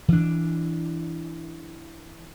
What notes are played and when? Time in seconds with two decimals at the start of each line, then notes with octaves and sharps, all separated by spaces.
0.08 E3 D4